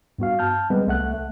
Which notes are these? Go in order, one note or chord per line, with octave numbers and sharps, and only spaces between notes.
G2 B3 F#4 F5
A5 F6 G6
G3 G#3 B3 C4 B4
C2 A3 F#5 F#6
A3